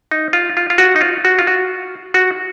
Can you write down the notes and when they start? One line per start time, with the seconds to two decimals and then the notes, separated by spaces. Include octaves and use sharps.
0.11 D#4
0.33 F4
0.57 F4
0.70 F4
0.78 F#4
0.96 D#4
1.01 F4
1.25 F#4
1.39 F4
1.47 F#4
2.14 F#4